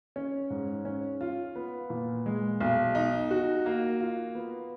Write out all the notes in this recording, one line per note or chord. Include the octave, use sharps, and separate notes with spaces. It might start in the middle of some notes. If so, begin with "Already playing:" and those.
C#4
G#2
C#4
F4
B3
A#2
G#3
B1
D#4
F#4
A#3
F4
B3